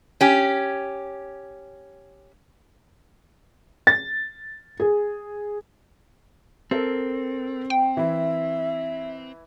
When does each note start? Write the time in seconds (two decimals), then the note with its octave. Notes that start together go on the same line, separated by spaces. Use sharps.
0.21 C#4 G4
3.87 A6
4.80 G#4
6.71 C4 A4 A#4
7.70 G5
7.97 E3 E4 E5